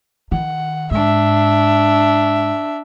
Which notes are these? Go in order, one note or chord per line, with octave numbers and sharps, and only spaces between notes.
D#3 F#5
G#2 D4 E5